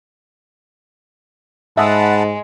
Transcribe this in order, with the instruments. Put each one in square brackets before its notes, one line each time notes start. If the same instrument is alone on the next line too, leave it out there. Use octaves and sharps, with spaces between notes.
[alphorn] G#2 [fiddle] G#3 [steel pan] E5 D#6 [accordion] F#5 A5 B5